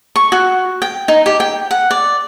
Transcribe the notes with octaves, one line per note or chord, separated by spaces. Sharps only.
C#6
F#4
G5
D#4
G4
G5
F#5
D5